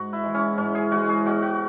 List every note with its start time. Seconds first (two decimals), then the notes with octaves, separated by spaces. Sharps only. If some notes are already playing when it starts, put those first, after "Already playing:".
Already playing: G#2 F#4
0.13 E4
0.23 E3 G#3
0.34 C#4
0.58 G#2 C#4
0.75 G#4
0.91 E3 G#3 F#4
1.09 G#4
1.25 B2 F#4
1.43 F#4